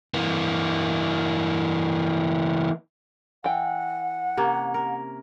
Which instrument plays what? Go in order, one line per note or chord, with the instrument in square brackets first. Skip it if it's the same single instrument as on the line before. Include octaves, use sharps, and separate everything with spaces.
[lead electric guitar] E3 A#3
[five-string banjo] E3 G5 [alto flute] F#5
[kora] C3 A#3 C#4
A#4